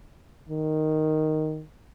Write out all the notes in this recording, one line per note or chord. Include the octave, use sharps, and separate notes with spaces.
D#3